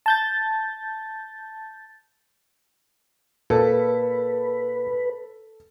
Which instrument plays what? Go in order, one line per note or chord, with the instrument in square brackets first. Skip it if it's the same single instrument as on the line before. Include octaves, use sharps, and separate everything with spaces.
[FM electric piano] A5 G6 A6
[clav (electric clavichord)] A#2 [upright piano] A4 [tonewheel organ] B4